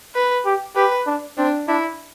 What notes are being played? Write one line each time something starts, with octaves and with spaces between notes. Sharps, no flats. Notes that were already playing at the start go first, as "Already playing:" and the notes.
B4
G4
G4 B4
D4
C4 D4
D4 E4